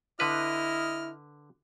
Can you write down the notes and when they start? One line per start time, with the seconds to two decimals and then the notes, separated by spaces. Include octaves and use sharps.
0.20 D3 E4 B4 D#5 F6